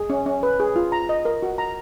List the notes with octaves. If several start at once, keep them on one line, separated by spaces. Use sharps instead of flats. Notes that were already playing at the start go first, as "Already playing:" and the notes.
Already playing: G#4
C#4
C#4
B4
G#4
F4
A#5
D#5
A#4
F#4
A#5